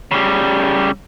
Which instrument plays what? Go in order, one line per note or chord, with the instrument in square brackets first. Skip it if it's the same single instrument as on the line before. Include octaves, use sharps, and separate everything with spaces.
[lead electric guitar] C#3 G3